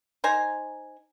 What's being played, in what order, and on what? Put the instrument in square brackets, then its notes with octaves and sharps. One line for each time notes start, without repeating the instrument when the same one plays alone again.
[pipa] D#4 C5 G#5 A#5